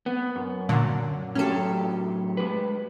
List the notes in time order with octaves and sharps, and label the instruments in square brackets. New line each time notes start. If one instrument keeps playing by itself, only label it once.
[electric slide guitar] B3
F#2
[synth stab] A#2 D3 F#3
[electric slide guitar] A2 F#3 G4 [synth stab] C#4 A4
[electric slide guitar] G#3 B4